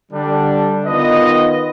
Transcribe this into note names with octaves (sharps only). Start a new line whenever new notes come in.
D3 G3 D4
D#3 B3 F4 B4 D#5